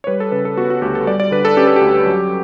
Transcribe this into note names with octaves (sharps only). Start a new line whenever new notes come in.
C#5
G3 B4
A4
C#3 B4
A4
B3 F#4
F#4
D2 G4
A4
G3 D5
D5
D3 B4
A4
C#4 G4
A4
D2 G4
F#3